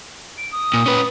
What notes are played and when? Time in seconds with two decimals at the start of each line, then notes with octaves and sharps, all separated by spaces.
0.38 D7
0.52 D#6
0.74 A#2
0.86 C#4 B4